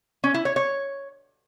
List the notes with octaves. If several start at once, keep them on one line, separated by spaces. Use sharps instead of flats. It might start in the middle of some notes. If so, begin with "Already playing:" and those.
C#4
E4
C#5
C#5